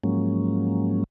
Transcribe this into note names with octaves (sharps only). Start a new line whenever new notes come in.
G#2 F3 F#3 G#3 A#3 C#4